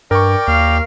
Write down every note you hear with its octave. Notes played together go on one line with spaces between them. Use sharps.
G2 A#4 D5 G5 C#6
D#2 F5